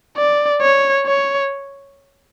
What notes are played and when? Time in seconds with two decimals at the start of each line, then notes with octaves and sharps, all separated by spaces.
0.17 D5
0.62 C#5
1.07 C#5